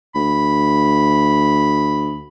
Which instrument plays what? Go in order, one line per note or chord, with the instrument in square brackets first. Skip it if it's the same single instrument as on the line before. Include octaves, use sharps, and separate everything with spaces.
[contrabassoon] D2 [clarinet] B5